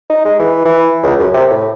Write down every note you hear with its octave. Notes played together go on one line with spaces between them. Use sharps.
D#4
G#3
E3
E3
C#2
F#2
C3
A2